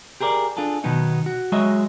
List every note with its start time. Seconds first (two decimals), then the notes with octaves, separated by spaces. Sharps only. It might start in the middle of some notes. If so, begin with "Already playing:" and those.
0.20 G4 G#4 A#4 C#5 D5
0.57 D4 F4 G#4 A4
0.84 B2 D#3 F#3 B3 D#4
1.26 F#4
1.52 F#3 G#3 F#4 C#5 D#5 E5